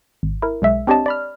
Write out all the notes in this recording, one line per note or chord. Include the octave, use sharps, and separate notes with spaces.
G#1
E4 A#4
B1 G#3 E5
C4 D4 G4 C#5 D#5 A5
D5 B5 F6